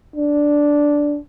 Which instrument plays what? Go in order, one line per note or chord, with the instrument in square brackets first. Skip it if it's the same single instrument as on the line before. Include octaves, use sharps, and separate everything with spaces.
[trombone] D4